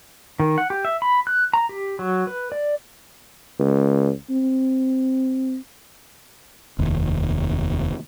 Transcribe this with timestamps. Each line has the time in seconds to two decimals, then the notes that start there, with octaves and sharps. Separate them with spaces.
0.40 D#3
0.58 F#5
0.70 G4
0.85 E5
1.02 B5
1.27 F#6
1.54 A#5
1.69 G4
1.99 F#3
2.27 B4
2.52 D5
3.59 C#2
4.30 C4
6.79 F1 D#2